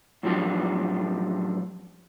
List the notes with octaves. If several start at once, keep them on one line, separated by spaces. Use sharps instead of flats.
F#2 A2 F3 G3 D4